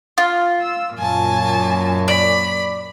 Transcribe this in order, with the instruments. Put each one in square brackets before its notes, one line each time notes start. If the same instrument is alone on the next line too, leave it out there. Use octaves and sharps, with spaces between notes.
[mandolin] F4
[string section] E6
[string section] F#2 A#2 [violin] G#5 A5
[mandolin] D5 [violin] B5